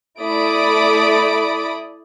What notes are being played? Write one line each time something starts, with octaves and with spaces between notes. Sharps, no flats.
A3 E4 D5 B5 D#6 D7